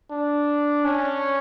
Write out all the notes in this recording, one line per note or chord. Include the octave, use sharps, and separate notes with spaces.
D4
C#4